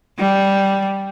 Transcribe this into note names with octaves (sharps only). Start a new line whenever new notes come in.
G3